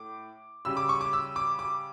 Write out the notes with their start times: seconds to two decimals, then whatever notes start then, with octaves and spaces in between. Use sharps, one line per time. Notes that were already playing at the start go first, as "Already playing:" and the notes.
Already playing: A2 D6
0.65 C#3 G3 E6
0.77 D6
0.89 C#6
1.01 D6
1.13 E6
1.36 D6
1.59 D6